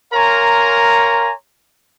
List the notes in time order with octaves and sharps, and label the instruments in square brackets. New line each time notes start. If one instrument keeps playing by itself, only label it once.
[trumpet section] A#4 C#5 F5 G#5 A#5 C6